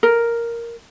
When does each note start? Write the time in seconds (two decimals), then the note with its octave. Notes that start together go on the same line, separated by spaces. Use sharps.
0.03 A#4